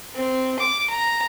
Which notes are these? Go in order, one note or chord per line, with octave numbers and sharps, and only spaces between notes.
C4
D6
A#5